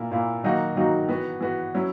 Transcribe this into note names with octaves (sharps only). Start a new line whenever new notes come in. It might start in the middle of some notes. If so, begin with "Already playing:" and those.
Already playing: A#2 A#3 E4
A#2 A#3 E4
D#3 F#3 A#3 D#4 F#4
D#3 F#3 A#3 D#4 F#4
E3 B3 F#4
E3 B3 F#4
F#3 C#4 E4